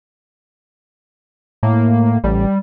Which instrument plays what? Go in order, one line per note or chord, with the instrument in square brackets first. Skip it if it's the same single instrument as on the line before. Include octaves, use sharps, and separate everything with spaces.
[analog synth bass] A2 [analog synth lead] A#3
[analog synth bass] A1 [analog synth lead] G3